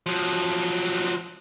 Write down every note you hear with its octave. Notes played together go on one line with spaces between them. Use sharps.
F3 F#3